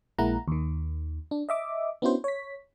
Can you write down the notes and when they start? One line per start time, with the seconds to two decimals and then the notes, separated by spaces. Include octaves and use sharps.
0.18 A#1 G#3 A#3 E4 F#5 A#5
0.48 D#2 D#3
1.31 D4
1.49 D#5 E5 D6
2.02 B3 C#4 D4 E4 F#4 C5
2.24 C#5 B6